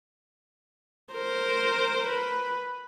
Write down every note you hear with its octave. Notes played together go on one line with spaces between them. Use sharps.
A#4 C5
B4